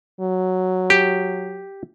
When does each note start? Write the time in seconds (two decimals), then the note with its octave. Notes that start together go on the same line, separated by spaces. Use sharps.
0.21 F#3
0.90 G4